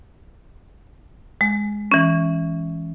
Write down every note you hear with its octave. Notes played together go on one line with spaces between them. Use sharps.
G#3
E3 C#4